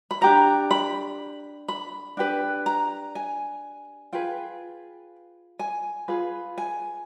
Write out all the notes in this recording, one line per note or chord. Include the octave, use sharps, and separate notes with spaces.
B5
D4 G4 A#4 A#5
B5
B5
D4 G4 B4
A#5
G#5
F4 G#4 B4 G5
G#5
F4 G#4 B4
G#5